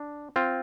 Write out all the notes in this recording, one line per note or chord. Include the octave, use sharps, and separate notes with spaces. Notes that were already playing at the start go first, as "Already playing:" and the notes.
Already playing: D4
C4 F4